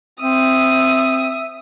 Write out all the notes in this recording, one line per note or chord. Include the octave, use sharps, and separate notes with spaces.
C4 E5 D#6